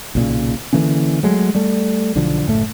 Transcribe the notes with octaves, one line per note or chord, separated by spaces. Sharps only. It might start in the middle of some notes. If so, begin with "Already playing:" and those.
B1 A#2 C#3
D3 E3 A#3 C#4
F#3 G#3 A3
G3 A3
B1 D3 F3
F#1 A2 A3